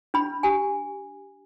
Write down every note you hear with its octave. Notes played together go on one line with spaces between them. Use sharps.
D4 B5
G4 G#5